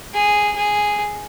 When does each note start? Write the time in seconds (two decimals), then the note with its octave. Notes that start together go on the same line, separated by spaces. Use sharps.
0.14 G#4
0.56 G#4